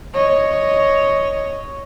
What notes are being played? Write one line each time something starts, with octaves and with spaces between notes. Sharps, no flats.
C#5 D#5